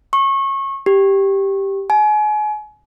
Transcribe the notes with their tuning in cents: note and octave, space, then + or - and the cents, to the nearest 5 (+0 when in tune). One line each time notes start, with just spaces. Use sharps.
C#6 -25
G4 +0
G#5 +35